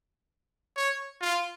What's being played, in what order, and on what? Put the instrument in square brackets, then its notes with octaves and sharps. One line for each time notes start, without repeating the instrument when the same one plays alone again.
[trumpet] C#5
F4